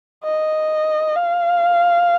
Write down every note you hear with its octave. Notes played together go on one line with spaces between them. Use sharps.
D#5
F5